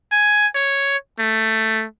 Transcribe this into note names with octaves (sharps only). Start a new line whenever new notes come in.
G#5
C#5
A3